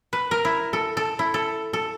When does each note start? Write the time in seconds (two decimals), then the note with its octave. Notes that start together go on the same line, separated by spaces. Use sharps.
0.13 B4
0.31 A#4
0.45 E4
0.73 A4
0.97 A4
1.19 E4
1.34 A4
1.73 A4